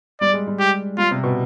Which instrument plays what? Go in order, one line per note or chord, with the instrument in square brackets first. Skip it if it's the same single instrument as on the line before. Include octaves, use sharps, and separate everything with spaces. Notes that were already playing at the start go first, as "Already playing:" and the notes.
[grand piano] G3 [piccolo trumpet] D5
[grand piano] G#3
G3
[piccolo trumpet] G4
[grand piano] G3 [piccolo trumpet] F4
[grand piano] C3
B2